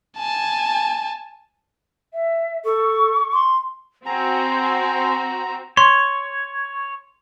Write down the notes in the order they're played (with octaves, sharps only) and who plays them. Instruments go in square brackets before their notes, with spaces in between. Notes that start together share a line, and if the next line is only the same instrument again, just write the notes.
[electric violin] G#5 A5
[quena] E5
[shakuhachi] A4 [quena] C#6
[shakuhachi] C6
[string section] C4 F#4 [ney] G#5 [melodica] A#5
[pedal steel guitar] C#5 [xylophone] C6